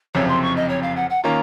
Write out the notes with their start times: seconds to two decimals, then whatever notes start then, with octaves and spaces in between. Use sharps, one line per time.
0.14 F#1 F2 C3 C#5
0.28 C6
0.42 C#6
0.56 D#5
0.69 C#5
0.83 F5
0.96 F#5
1.10 F#5
1.23 D#3 A#3 C#4 F4 A#5